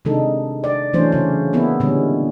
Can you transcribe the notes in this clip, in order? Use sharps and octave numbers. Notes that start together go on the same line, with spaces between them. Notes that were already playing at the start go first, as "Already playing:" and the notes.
C3 D#3 G#3 D4 D#4 A4
D5
E3 F#3 A3 C#4 D4 C5
C#3 C#4
A#3 B3 E4
A#2 D3 G3 G#3 B3 C#4